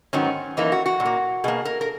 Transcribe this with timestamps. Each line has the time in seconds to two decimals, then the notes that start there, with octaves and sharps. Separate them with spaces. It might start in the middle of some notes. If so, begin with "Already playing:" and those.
0.13 G#2 D#3 F#3 B3 C#4
0.57 F#2 E3 A#3 D#4
0.72 F#4
0.86 F#4
1.00 A#2
1.05 A#3
1.44 B2 A#3 G#4
1.65 A#4
1.81 A#4